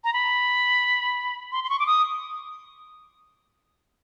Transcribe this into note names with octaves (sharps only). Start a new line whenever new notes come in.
A#5
B5
C6
C6
C#6
D6
D#6